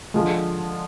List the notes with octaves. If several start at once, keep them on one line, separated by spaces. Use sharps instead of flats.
D3 F3 G#3